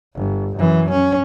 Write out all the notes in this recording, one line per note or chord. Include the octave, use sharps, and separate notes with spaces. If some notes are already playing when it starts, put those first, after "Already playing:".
G1
F#2 E3
C#4